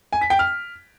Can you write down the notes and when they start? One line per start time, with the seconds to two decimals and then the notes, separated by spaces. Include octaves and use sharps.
0.13 G#5
0.21 B6
0.30 G5
0.39 F6